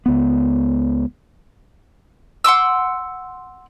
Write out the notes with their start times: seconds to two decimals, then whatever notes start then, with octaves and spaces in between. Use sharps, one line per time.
0.06 C#2 B3
2.44 F#5 C6 D6 E6